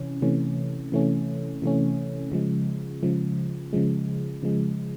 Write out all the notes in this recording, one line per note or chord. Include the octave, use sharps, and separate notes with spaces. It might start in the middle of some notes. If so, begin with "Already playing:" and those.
Already playing: C3 E3 C#4
C3 E3 A3 C#4
C3 E3 A3 C#4
C3 E3 A3 C#4
C#3 F3 G#3
C#3 F3 G#3
C#3 F3 G#3
C#3 F3 G#3